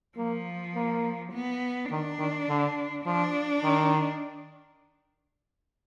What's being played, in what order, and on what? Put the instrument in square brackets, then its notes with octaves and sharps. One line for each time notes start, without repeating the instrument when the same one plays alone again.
[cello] F3 [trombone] A#3
[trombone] A#3
[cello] B3
[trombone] D#3 [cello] D4
[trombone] D#3
D3
[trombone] F3 [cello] D4
[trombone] D#3